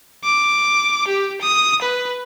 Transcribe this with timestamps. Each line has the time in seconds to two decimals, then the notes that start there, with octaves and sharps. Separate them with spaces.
0.24 D6
1.07 G4
1.41 D#6
1.81 B4